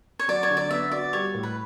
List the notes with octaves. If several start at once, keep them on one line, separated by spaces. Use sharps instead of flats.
C#5
F#3 D5
C#5
D3
D5
B3 E5
F#4 D5
G3 C#5
A2
B4